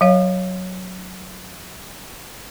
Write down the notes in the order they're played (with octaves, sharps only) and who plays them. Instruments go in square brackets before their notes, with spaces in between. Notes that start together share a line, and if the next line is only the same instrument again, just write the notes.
[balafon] F#3 C#5 F5